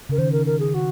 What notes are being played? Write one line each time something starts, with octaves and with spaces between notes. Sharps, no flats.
C#3 A#4
D#3 C5
A#4
A#4
G#4
F#4